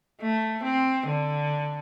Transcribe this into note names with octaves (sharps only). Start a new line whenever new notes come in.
A3
C4
D3